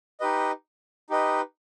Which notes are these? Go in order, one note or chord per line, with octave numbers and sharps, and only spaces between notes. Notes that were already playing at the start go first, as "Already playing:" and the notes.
D#4 G4 B4 D#5
D#4 G4 B4 D#5